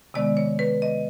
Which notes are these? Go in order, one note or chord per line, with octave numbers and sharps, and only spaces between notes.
C3 D#3 G#3 B3 D5
C#5
B4
D#5